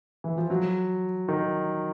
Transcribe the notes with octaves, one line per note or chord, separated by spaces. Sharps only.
E3
F3
F#3
D#3